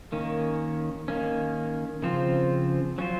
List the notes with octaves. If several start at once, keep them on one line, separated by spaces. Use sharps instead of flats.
D#3 A#3 C#4
D#3 A#3 C#4
C#3 F3 C4 F4
F#3 C#4 F4 C5